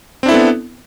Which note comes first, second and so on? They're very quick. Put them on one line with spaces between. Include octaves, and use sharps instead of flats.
C4 D4 E4 A4 B3